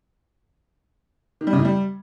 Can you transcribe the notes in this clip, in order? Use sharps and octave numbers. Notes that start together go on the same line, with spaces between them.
D#3
G3
C#3
A2
G3